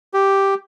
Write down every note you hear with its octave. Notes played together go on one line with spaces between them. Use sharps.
G4